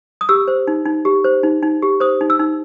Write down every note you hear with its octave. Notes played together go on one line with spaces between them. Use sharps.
D#6
G4 E6
C5
D#4
D#4
G4
C5
D#4
D#4
G4
C5 D#6
D#4
E6
D#4